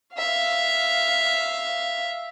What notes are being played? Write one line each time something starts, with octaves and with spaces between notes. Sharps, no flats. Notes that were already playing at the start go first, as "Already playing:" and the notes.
E5 F5